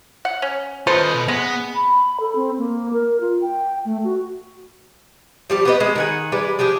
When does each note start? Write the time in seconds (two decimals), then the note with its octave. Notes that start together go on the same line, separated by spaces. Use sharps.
0.25 F#5
0.42 C#4
0.87 F4 A4 B4 C5 D#5
1.14 B2
1.28 G#3 B3
1.75 B5
2.20 A4
2.36 C4
2.58 A#3
2.93 A#4
3.21 F4
3.42 G5
3.85 A3
4.04 F#4
5.50 F3 G3 G4
5.65 B3 C4 B4 D#5
5.80 G#3
5.96 D#3 F#5 G#5
6.32 G3 G#3 B4
6.59 F3 D4 G4 G#4